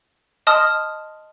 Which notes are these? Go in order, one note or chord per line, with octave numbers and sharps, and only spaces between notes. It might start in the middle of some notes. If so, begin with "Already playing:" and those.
D#5 A5 C6 D#6 F6